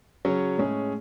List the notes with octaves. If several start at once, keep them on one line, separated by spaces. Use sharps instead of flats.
C#3 F#3 C#4
A2 G#3 C#4 G#4